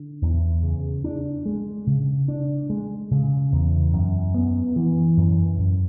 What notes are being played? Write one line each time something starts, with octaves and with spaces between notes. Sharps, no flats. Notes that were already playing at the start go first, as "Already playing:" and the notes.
Already playing: D3
E2
C#3
D4
G#3
C#3
D4
G#3
C#3
E2
F#2
B3
E3
F#2
F#2